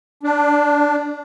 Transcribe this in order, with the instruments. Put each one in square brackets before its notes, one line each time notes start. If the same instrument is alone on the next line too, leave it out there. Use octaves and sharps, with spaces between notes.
[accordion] D4